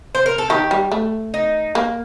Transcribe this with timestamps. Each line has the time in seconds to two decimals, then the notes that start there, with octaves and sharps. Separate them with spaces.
0.15 C5
0.26 A#4
0.38 A4
0.50 D#3 G4
0.71 G3
0.92 A3
1.34 D#4
1.75 A#3